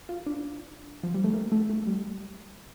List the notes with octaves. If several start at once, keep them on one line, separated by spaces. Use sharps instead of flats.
F4
D4
F3
G3
A3
A#3
A3
A3
G3